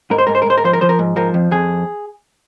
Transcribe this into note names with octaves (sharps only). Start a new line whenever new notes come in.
G#2 A#4
C5
G#2 A#4
C5
A#4
G#2 C5
A#4
F3 C5
A#4
F3 C5
A#4
G#2
F3 A#4
F2
F2 G#4